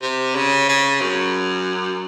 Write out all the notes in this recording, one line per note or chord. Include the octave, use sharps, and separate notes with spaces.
C3
C#3
C#3
F#2